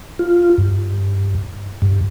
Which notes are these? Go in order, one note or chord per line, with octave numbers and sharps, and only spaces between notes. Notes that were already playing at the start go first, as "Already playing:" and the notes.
F4
G2
G2